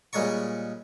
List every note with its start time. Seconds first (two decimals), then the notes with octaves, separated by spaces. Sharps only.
0.13 A#2 G3 G#3 C#5 A#5 C#6